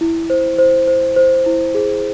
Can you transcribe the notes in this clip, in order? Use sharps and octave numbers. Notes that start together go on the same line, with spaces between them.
E4
C5
C5
C5
C5
E4
G#4